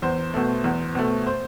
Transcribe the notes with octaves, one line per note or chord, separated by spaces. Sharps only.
E2 C5
B2 A3
E2
B2 A3
C5